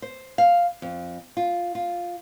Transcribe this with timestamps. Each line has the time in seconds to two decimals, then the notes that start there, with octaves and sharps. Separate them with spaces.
0.02 C5
0.38 F5
0.82 F2
1.37 F4
1.75 F4